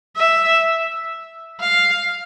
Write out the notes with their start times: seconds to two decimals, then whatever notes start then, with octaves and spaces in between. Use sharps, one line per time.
0.17 E5
1.60 F5